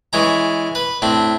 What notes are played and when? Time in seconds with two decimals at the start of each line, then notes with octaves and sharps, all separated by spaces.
0.13 E3 G#3 C#4 A#5
0.75 B4
1.02 A2 C4 D4